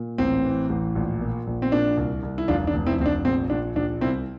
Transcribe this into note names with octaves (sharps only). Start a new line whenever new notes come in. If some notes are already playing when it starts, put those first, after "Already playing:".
Already playing: A#2
A1 C4
E3
A1
A#1
A#2
A#1
C4
A#2 D4
C2
C2
E4
F1 D4 F4
D4
F1
C4 E4
F1 C4
D4
A#1 C4
A#1 D4
A#1 D4
C2 C4 E4